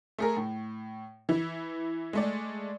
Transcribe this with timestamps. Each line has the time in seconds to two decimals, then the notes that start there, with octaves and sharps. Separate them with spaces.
0.18 A3 G#4 A#4
0.37 A2
1.29 E3 E4
2.13 G#3 A3 D5